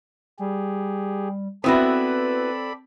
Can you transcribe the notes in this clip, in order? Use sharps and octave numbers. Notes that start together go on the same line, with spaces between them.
G3 G4 G#4
B3 C4 E4 F#4 A4 B4 D5 B5